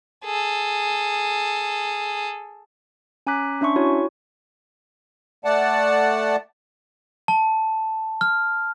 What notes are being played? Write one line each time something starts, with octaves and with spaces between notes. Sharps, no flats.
G#4 A4
C#4 G#5 A#5 D6 F#6 B6
C#4 D4 E5 C6 C#6
E4 F#4 C#5 G#5
A3 D5 F#5 A5
A5
F6